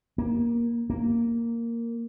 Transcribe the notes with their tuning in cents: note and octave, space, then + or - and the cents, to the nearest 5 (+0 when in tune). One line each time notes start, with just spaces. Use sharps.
A#3 +15
A#3 -5